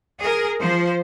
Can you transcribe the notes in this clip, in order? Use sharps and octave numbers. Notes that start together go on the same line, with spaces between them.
G#4 A#4
F3 C5